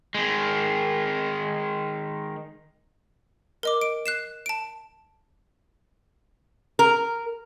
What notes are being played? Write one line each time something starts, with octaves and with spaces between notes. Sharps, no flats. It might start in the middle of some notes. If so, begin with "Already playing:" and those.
D#3 G#3
A#4 D#5 D6
D7
F#6 C7 E7
A5 D7
A#4